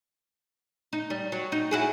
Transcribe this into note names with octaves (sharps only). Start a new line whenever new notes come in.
D#4
G3
F#3
D#4
E4 F#4 G#4